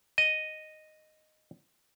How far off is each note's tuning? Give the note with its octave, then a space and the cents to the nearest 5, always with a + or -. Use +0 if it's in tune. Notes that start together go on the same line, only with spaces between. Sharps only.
D#5 -5